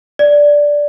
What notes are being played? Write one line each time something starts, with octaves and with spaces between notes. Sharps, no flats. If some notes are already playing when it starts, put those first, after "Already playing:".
D5